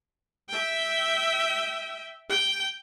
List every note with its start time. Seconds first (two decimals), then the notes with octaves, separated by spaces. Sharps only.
0.49 E5 G5
2.29 G5